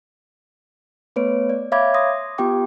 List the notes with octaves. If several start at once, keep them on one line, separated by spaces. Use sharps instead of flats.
A3 B3 B4 C#5 D7
D5
C#5 E5 F5 B5 D6 G#6
C6 D#6 A#6
B3 F4 G4 G5 D6